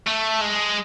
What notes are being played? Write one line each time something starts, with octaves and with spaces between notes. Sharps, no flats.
A3
G#3